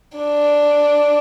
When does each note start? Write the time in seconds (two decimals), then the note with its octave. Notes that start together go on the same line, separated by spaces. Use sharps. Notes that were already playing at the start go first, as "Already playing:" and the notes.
0.18 D4